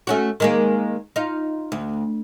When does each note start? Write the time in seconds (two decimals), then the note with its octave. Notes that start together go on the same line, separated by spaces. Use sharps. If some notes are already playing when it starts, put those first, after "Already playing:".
0.07 A3 C#4 F#4
0.40 D#3 G#3 A#3
1.16 D#4 F4
1.72 D2